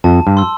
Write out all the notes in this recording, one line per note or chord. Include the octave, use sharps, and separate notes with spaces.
F2 A5
G2
C6 E6